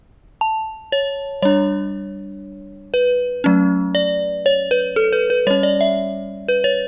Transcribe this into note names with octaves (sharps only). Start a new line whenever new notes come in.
A5
C#5
G3 D4 C#5
B4
F#3 A3 C#4
D5
C#5
B4
A4
B4
B4
G3 C#4 C#5
D5
E5
B4
C#5